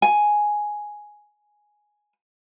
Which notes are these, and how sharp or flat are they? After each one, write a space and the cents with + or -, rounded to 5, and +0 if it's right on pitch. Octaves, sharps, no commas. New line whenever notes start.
G#5 +5